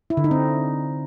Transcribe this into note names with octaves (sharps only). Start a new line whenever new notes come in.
E4
D3
D#4
C4